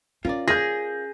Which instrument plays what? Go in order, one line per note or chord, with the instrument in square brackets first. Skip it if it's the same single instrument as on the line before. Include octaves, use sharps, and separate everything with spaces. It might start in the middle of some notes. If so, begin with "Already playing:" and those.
[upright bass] C#4 [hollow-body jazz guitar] F4 A#4 D5
[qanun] G#4 [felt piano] G6 A#6